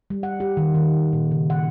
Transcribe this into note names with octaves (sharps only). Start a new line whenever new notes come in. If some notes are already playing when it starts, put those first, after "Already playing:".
G3
F#5
G4
D#3
D#3
A#2
C#3
F#5